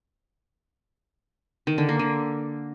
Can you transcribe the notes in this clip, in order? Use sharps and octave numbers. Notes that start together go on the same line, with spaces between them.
D#3
D3
A#3
D3